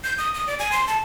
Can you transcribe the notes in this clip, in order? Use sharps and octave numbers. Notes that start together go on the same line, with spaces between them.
G6
D#6
D#6
D5
G#5
C6
A5